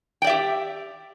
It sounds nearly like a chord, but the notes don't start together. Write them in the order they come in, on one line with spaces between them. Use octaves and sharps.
G5 D5 E5 G4